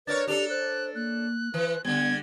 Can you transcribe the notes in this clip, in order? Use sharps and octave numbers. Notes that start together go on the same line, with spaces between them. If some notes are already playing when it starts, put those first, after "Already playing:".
D4 A#4 B4 C#5 A6
D4 G4 A4 F7
C5 F#6
A#3 F#6
E3 B4
D3 G3 B3 G#6